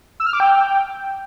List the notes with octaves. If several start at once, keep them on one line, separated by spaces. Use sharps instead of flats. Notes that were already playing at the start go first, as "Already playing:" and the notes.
E6
F6
D6
G5